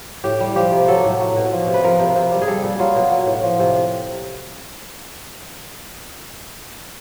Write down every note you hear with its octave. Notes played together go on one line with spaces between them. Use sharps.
A2 G4
G3
F3 G4
C3
F#3 A4
A2
F#3
B2
F3
C3
B4
F3 A#4
C3
C3
G3
G#4
G3 A4
A#2
F#3 F4
B2
F#3
A2
F3
C3